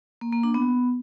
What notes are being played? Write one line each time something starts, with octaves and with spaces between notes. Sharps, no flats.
A#3
A#3
D4
B3